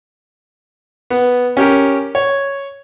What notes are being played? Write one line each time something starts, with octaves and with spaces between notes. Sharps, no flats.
B3
C#4 G4 A#4
C#5